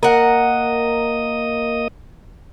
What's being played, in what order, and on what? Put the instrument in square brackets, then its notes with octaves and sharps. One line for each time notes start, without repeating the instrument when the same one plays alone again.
[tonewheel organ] A#3 D#5 D#6 [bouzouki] A#4 F#5